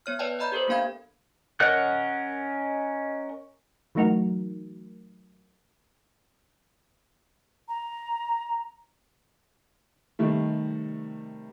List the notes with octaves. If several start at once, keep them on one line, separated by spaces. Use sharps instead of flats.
B3 C#5 F6
B4 C#5 D5 G5 A5
D5 D#5 A#5 B5 G6
G4 A4 A#4 C5
A#3 B3 D4 F5 B5 G#6
C#4 A#4 D#5 F#5 F#6
E3 F#3 A3 D#4 F#4 A#4
A#5
C3 D#3 G3 A3